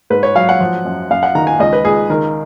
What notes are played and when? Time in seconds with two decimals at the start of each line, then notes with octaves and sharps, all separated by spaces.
0.10 G#2 B4
0.23 C#5
0.35 F#3 F5
0.49 F#5
0.60 F3
0.85 F#2
1.10 F#2 F5
1.23 F#5
1.35 D#3 A#5
1.47 G#5
1.59 C#2 D#5
1.73 B4
1.85 C#2 G#4
2.10 D#3 A#4